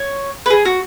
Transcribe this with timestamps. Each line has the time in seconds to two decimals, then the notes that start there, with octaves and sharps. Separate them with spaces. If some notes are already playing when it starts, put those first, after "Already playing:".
Already playing: C#5
0.46 B4
0.50 G#4
0.65 F#4